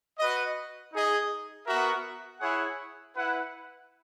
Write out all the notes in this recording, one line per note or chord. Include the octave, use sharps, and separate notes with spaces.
F#4 B4 D#5
D#4 G#4 D#5
B3 F#4 A#4 E5
E4 G#4 C#5 F#5
E4 B4 F#5